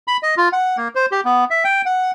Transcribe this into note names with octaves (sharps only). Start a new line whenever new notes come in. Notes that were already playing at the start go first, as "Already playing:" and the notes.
B5
D#5
F4
F#5
A#3
C5
G4
B3
E5
G5
F#5